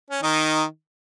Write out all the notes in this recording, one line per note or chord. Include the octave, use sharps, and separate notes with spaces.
C#4
D#3 D#4